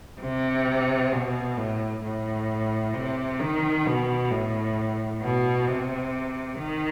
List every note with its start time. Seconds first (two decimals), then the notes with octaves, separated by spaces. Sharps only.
0.21 C3
1.12 B2
1.57 A2
2.04 A2
2.94 C3
3.40 D#3
3.86 B2
4.31 A2
5.22 B2
5.67 C3
6.58 D#3